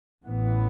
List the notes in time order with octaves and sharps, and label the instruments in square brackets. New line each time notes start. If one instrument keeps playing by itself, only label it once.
[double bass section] A1 A2 E3 B3